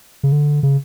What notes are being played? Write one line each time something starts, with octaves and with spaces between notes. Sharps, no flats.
C#3
D3
C#3